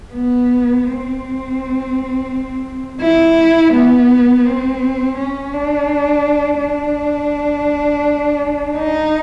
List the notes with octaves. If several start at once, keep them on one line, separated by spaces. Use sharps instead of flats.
B3
C4
E4
B3
C4
C#4
D4
D4
D#4